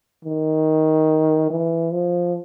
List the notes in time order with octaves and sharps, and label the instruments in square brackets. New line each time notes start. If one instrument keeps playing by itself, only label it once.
[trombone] D#3
E3
F3